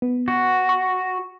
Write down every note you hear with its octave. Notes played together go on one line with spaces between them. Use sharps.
B3
F#4
C#6